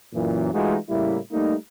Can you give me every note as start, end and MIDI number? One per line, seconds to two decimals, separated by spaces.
0.14 0.51 42
0.14 0.51 46
0.14 0.51 52
0.53 0.76 52
0.53 0.76 56
0.53 0.76 57
0.53 0.76 63
0.53 0.76 65
0.53 0.76 66
0.89 1.18 45
0.89 1.18 49
0.89 1.18 55
0.89 1.18 58
0.89 1.18 64
1.32 1.54 55
1.32 1.54 57
1.32 1.54 58
1.32 1.54 63